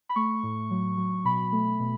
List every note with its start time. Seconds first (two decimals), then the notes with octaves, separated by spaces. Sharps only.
0.09 B5
0.16 A3 C#6
0.43 A2
0.71 F#3
0.97 F#3
1.24 B2 B5
1.52 A3
1.80 B2